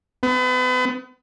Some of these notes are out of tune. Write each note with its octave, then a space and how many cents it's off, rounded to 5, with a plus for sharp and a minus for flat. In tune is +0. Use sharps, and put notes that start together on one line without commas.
B3 +40